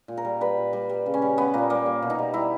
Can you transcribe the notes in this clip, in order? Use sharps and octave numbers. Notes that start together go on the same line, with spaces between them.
A#2
A#4
G3
G3 B4
A#2
G3
G3
C#3
C#4
G3
G3 B3
A#2 A#3
G3 A#3
G3
B2
D#4
G3
G3 E4